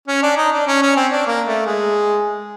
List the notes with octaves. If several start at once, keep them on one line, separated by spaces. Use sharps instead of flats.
C#4
D4
D#4
D4
C#4
C#4
C4
D4
A#3
A3
G#3